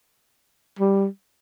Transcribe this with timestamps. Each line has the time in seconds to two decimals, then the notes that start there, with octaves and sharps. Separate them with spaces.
0.79 G3